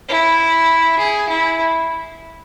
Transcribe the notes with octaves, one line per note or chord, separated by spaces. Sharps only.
E4
G#4
E4